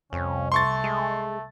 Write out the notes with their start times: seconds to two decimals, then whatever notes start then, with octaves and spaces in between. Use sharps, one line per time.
0.13 C2 F2 C#4
0.52 A3 C6 C#6 A6
0.84 G#3